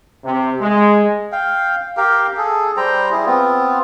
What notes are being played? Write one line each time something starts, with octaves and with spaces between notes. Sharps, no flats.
C3
G#3
F5 G5
G4 A#4 F5 G5
G#4 A4
G3 C5 G5 A#5
G3 E4 G#4
B3 C4 F4